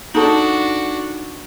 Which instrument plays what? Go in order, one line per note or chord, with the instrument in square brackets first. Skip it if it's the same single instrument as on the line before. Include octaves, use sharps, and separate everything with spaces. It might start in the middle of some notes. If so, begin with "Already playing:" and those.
[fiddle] D4 F#4 [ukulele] D#4 A4